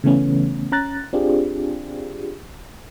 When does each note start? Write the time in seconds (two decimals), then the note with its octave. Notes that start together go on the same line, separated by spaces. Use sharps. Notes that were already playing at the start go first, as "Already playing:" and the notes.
0.04 C#3 E3 A3 B3 C#4
0.72 C#4 A#5 F#6 A6
1.13 C4 D4 F4 G4 G#4